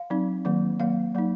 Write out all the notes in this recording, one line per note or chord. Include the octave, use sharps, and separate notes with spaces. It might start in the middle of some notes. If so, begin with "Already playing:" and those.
Already playing: F5
F#3 C4 D#4
D#3 F#3 A#3
D#3 F#3 A#3 F5
F#3 A#3 D#4